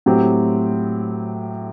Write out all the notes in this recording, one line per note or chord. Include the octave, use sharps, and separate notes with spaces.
A2 F#3 C4 G4